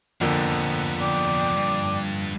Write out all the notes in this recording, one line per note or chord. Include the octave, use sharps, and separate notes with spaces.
F2 D3 F3 A#3 B3
D5 G5 D6
G2